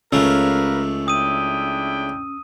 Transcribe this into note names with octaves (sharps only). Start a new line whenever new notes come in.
C#2 C#3 A3 C#4 A#4 B4 F5 E6
D4 E4 G5 D#6 D#7